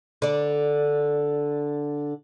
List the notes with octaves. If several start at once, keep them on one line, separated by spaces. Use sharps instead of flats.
D3 D5